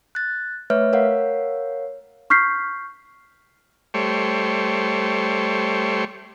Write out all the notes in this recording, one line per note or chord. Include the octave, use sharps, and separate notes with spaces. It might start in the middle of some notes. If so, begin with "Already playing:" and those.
F#6 A6
A3 B4 C#5 E5 F6
A#4 C#5 F5 F#5
C#6 F6 G6 B6 C7
G3 A3 C5 C#5